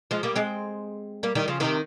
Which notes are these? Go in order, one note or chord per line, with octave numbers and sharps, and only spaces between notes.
F3 G#3
G3 A#3
G#3 C4
G3 A#3
D#3 G3
C#3 F3
C3 D#3